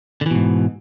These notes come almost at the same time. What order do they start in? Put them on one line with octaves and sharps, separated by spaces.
D3 E3 B2 G#2